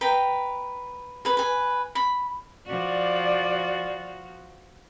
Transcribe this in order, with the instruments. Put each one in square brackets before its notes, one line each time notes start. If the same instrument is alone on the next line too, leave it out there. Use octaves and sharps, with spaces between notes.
[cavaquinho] B4 G5 A#5
G#4 B4
B4 G#5
B5
[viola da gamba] F3 F#4 [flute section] D5